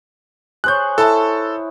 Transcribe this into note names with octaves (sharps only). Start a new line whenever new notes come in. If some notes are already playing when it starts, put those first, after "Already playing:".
G#4 C5 C#5 F#6 G6
E4 A4 A5